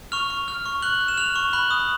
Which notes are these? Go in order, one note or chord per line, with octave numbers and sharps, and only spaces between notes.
C#6 F6 F7
C#6
F6
C#6
C#6 F#6 F#7
F6
E7
F6 F7
C#6
B5 F#6 F#7
D#6